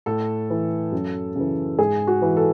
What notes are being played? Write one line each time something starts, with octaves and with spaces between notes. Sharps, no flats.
A2 A4
E3
F#2
C#3 E3
G#2 G#4
F#4
E3
A4